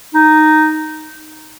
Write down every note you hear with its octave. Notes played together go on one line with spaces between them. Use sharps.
D#4